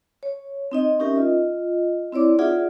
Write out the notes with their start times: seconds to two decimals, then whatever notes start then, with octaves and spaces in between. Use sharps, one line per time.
0.23 C#5
0.72 C4 D#4 D#5
0.99 C#4 D#4 G4 A#4 E5
1.16 F4 D#5
2.13 C4 E4 C#5 D5 D6
2.39 D#4 F4 G#4 D5 E5 F#5